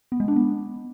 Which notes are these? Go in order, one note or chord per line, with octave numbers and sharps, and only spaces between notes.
B3
G#3
D4
B3